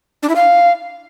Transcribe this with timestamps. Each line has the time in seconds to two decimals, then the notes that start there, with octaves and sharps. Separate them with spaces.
0.23 D4
0.29 E4
0.36 F5